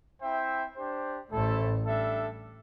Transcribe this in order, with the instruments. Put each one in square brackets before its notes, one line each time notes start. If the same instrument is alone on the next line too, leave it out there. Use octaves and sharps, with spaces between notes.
[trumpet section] C4 E4 C5 E5 G5
D4 G4 C5
[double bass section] A1 A2 [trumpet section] A3 E4 A4 C5
[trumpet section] G3 D4 A4 E5